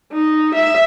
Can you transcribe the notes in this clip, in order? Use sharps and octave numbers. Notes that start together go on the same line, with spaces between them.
D#4
E5